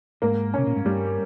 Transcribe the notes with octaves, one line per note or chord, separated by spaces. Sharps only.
G#2 A#3
C3 C#4
A#2
G#2
G2 G3